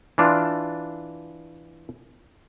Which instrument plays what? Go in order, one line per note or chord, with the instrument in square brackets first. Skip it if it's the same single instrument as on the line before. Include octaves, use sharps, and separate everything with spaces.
[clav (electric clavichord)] E3 D4 F4